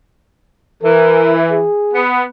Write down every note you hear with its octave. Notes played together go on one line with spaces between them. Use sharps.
E3 A#4
G#4
B3